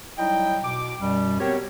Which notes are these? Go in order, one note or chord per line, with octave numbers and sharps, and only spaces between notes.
F#3 G3 D#4 E4 D#5 G5
B2 D6
F#2 B2 G3
B3 C4 F#4 G4 A#4 C#5